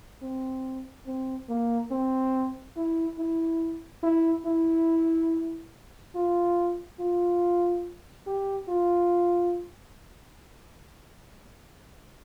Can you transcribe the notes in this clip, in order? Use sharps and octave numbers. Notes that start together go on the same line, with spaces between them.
C4
C4
A#3
C4
E4
E4
E4
E4
F4
F4
G4
F4